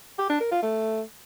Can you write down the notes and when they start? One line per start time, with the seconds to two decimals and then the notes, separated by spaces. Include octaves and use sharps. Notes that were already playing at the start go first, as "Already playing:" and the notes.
0.18 G4
0.29 D4
0.40 A#4
0.51 F4
0.62 A3